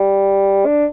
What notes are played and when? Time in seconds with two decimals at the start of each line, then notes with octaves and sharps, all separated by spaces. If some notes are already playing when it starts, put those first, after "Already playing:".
Already playing: G3
0.66 D4